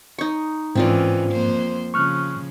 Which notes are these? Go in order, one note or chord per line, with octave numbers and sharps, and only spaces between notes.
D#4 C#6
G#2 D#3 E3 C4 C#4 F4 D5
F2 A#3 C5
C#3 F3 C#6 F6 F#6